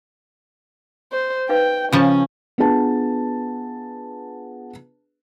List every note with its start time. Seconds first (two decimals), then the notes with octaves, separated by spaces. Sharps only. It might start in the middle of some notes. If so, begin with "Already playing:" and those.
1.12 C5
1.49 D#4 B4 F5 G5
1.93 C#3 F3 C#4 A5
2.58 B3 D4 F4 G#4 B4 A5